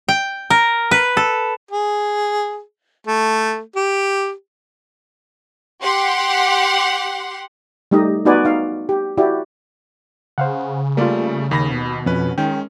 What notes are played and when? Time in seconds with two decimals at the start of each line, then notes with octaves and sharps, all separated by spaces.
0.09 G5
0.50 A#4
0.91 B4
1.17 A4
1.71 G#4
3.07 A3
3.76 G4
5.82 G4 F#5 C6
7.91 G3 A3 D#4 G4 D#5
8.25 B3 D#4 F#4 B4 D5 G#5
8.45 D#4 F5
8.89 G4
9.17 E4 F#4 G4 D5
10.38 C#3 C5 F5 F#5
10.97 G3 A3 A#3 F4 D5
11.51 D#2 D#3 B5 A#6
11.71 B2
12.06 F2 C#4 B4
12.38 D#3 G#3 C#4 G5